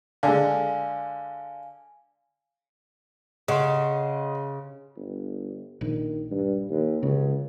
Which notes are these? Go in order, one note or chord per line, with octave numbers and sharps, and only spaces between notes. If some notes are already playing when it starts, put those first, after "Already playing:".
D3 G#3 F5 G#5
C#3 D#5 F#5 C6
G1
A#1 D#3
G2
D#2
C#2 C#3